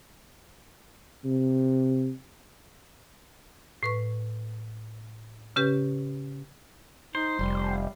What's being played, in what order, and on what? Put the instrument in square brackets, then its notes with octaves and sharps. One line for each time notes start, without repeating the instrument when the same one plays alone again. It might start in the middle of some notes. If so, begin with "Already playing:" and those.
[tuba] C3
[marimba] A2 B4 C#6
C#3 C#4 G4 B4
[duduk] D#4 [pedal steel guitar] C5
[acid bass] F1 [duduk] G3